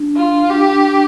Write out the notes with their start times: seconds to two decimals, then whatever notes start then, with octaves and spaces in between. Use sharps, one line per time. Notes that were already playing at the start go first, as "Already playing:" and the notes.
Already playing: D4
0.17 F4
0.51 G4